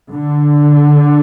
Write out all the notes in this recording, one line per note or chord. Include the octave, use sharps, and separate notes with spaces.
D3